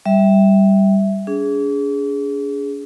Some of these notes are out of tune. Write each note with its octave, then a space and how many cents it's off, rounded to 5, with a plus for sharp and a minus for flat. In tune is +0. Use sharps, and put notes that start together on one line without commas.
G3 +0 E5 +0
D4 -40 G#4 +0